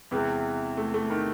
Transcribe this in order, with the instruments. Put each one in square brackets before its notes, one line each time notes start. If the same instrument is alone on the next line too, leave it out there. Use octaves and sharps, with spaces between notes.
[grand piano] E2 C3 E3 [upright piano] G#3
[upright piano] A3
A3
D#3